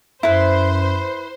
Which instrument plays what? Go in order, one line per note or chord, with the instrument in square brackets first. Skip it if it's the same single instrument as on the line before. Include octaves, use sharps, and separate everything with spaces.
[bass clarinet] F#2 [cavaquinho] E4 B4 [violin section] C5